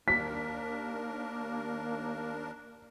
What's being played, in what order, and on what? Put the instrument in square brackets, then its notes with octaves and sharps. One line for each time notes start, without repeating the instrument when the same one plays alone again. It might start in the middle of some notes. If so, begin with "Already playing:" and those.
[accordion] D#2 D4 A#4 [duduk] A#3 [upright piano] B6